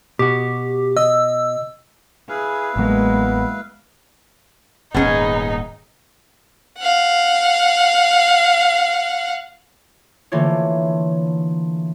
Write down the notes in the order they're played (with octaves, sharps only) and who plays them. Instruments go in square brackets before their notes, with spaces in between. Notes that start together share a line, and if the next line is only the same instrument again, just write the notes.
[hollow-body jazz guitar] B2 F#4 [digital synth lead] G4
[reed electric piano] D#5 [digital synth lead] E6
[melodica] E4 B4 F5 [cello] G#4
[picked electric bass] A1 F#3 [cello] G#3 A#3 [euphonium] B3
[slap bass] D#1 G#2 [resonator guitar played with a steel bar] B3 C#4 G#4 [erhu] D#4
[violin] F5 F#5
[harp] D3 E3 A3 A#3 F4 C#5